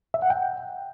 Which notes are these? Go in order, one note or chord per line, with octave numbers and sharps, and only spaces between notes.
E5
F#5
G5